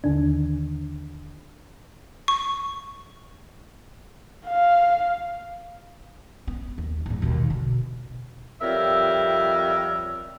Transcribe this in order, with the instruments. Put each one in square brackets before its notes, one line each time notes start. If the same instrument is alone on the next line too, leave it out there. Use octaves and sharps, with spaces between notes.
[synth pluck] D#2 D3 D#3 D4
[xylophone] C#6
[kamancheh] F5
[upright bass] B3
D#2
E2 G#2
D#2 B2
B2 D3
[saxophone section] F2 G3 A#4 C#5 E5